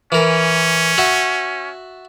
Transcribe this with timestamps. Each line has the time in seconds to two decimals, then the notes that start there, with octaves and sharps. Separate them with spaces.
0.12 E3 C#4 A#4
0.98 F#4 E5 A5